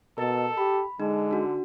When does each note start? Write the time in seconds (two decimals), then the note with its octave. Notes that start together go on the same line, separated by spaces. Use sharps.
0.18 B2 A4 A#4 D#5 A6
0.57 G4 B5
1.00 D3 G#3 D#4
1.31 D4 F#4